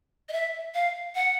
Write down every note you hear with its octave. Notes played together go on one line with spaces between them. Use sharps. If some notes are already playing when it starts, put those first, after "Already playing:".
D#5
E5
F5
F#5